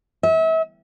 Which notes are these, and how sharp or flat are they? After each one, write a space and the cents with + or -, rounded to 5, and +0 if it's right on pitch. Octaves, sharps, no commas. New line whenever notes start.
E5 -35